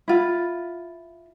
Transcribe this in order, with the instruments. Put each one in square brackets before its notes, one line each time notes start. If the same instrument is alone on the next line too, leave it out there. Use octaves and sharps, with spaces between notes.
[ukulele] E4 F4